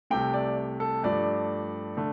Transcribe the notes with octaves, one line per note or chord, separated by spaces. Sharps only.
C2 C3 A3 G5
D5
A4
G2 F3 A3 D5
D3 A3